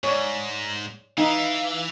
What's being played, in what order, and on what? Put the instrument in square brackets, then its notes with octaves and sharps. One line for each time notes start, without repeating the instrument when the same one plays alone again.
[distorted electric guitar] G#2 [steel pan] C#5 D5
[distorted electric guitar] E3 [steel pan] D#4 [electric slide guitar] F5